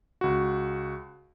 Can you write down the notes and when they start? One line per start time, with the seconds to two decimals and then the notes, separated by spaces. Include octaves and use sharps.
0.21 C#2 F#4